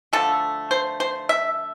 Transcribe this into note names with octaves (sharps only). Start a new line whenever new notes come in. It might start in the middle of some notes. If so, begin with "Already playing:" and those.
D3 F3 A3 A4
C5
C5
E5